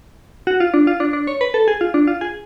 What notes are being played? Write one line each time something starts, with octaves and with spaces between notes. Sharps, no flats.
F#4
F4
D4
F4
D4
D4
C#5
B4
A4
G#4
F4
D4
F4
G#4